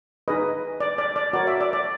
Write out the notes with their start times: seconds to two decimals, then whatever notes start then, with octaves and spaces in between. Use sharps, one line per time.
0.28 D#4 G#4 B4 D#5
0.80 D5
0.98 D5
1.16 D5
1.33 F#4 A#4 C#5 D5
1.47 E5
1.61 D5
1.73 D5